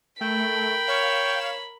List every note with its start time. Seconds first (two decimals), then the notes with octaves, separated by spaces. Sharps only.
0.21 A3 A#4 G5 B5
0.88 C#5 F5 E7